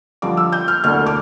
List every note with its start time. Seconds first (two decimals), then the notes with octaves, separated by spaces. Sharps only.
0.22 F2 D3 G3 D4 F4 D6
0.37 E6
0.52 G6
0.68 F6
0.84 E1 D2 D3 A3 F6
1.06 D6